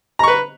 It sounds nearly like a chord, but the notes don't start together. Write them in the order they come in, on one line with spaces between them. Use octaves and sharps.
A#5 C#6 B4